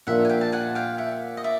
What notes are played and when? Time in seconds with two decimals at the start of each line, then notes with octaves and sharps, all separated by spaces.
0.07 A#2 F3 A#3 D4 E5 F#5
0.25 G#5
0.29 F5 G5
0.41 A5
0.52 F#5 G#5
0.75 F5 G5
0.98 E5 F#5
1.37 D#5
1.44 D5 E5